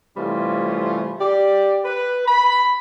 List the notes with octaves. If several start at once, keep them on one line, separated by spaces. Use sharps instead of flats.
C3 E3 G3 A3 C#4 F4
G4 D5
B4
B5